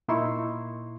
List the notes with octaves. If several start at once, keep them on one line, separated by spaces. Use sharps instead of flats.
A#2 D#4 E4 C6 C#6